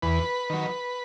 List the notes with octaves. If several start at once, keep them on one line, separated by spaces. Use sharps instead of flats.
E2 B4
D#3 F#3